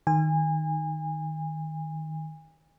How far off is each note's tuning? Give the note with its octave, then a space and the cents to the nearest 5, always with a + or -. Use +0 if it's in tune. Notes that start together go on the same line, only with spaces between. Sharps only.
D#3 +0 G#5 -30